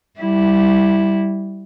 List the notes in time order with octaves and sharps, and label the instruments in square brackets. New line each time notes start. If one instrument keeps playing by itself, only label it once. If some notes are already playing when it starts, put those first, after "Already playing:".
[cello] G3 E4